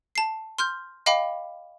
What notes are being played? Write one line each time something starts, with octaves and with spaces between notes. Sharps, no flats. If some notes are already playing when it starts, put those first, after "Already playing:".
A5 C7
C6 F6 G6
D#5 F5 G5 B5 D6